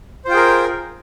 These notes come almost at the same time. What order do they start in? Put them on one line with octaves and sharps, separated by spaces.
C5 F4 G5 G#4 A#4